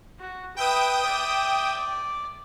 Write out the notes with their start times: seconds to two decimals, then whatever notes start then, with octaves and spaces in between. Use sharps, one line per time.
0.19 F#4
0.56 B4 E5 G5 D#6
1.03 D5 E5
1.77 D5